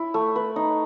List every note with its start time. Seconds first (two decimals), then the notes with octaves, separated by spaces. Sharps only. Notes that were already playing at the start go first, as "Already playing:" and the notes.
Already playing: E4
0.14 A3
0.36 B4
0.56 D#4